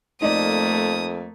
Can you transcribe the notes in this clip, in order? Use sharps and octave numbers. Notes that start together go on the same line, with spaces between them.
F2 A3 A#3 D#4 D5 D#6